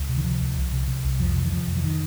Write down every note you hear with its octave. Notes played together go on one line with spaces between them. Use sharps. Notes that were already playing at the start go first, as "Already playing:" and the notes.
Already playing: C#2
C3
D#3
C3 F3
C#2
C2
C3
C3
C2
F2 F3
C3
D#3
C3 F3
F2
F3
D#3